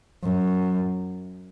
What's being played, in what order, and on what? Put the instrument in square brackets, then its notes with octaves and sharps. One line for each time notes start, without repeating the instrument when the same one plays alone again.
[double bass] F#2